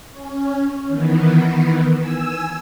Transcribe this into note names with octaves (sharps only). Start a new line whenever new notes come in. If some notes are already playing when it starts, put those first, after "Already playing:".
C#4
D#3 E3 B3
G#5 E6